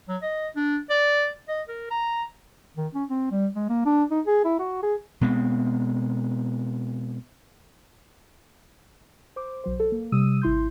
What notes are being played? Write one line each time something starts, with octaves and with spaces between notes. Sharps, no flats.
F#3
D#5
D4
D5
D#5
A#4
A#5
D#3
C#4
C4
G3
G#3
A#3
D4
D#4
G#4
E4
F#4
G#4
B2 G#3 B3 C4
C5 D6
B1 F#3 C5
A4
A#3
C3 G3 D#6 E6 D#7
G#1 E4 C6 G6